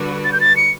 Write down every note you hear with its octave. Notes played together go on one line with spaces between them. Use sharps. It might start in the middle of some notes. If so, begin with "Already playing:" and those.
Already playing: D3 G3 D4 F#4 B4
A6
G6
A6
C#7